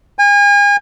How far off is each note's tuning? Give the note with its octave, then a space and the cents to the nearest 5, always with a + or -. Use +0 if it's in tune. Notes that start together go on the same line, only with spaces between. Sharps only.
G#5 -35